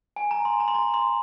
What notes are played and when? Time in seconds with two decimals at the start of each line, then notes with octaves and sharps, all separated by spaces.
0.16 G#5
0.31 A#5
0.45 C6
0.60 A#5
0.68 C6
0.75 A#5
0.94 C6